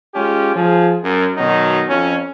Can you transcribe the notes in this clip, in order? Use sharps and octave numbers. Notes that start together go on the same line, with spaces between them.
G#3 C#4 F4 G4
F3 G#4
F#2
B2 D#3 F#3 D#4
F2 C#4